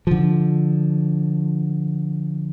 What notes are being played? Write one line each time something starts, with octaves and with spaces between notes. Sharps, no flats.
D3 F3